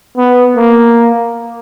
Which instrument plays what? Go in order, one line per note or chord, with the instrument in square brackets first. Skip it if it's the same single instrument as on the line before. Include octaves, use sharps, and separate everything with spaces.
[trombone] B3
A#3